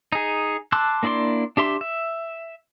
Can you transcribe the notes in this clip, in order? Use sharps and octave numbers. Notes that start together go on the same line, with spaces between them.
D#4 G#4
A5 C6 D6 E6 F#6
A#3 D4 E4 D5 C6
D4 G4 E5 C6
E5